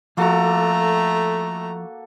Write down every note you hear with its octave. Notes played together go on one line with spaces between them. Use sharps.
F3 A3 A#3 F#4 A4 A#5